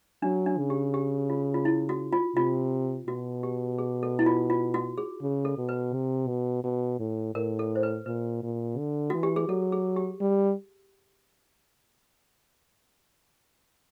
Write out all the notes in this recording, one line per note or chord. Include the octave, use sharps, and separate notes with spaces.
F#3 D4
D4
C#3
G4
G4
F4
F4
E4
F#4
F4
C3 F4
B2 F#4
G4
G#4
A4
E4
F4
F4
F#4
G#4
C#3
A4
B2
B4
C3
B2
B2
A2
A2 A#4
A4
C5
B4
A#2 B4
A#2
D3
E3 F#4
G4
G#4
F#3 A4
G#4
G4
G3